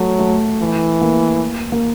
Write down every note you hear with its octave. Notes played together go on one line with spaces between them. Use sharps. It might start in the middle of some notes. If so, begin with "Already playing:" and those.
Already playing: F#3 A3
A3
E3
A#3
A#3